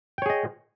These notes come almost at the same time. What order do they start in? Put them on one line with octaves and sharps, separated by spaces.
G5 C#5 G#4 D#5